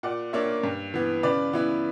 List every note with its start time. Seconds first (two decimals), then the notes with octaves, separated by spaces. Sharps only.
0.03 A#2 D5 F#5
0.33 A#3 D4 C#5 E5
0.63 G2
0.94 E3 B3
1.23 C#3 B4 D5
1.53 E3 B3 E4